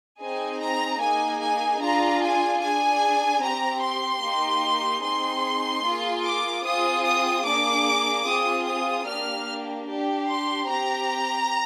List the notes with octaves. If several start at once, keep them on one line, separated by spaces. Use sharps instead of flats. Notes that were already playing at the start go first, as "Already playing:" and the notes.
C4 D#4 G#4 G#5
A#5
A#3 D#4 G#4 G#5
G#5
D4 F4 G#4 A#5
G#5
D4 G#4 G#5
C4 G4 A#5
C6
A#3 D#4 G4
C4 D#4 G#4 C6
A#3 F4 G#4
D6
C4 F4 G#4 D#6
D#6
A#3 D4 G#4 D6
C4 F4 G#4 D#6
D#6
A#3 D4 G4 F6
D4 G4
C6
C4 G4 A#5